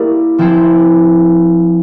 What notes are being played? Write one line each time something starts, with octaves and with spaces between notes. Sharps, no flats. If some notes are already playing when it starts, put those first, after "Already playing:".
Already playing: A#3 E4 G4 A#4 D5
F3 C4 E4